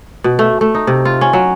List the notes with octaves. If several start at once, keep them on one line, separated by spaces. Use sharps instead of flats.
B2
A3
A3
D#4
C3
F4
C#4
F#3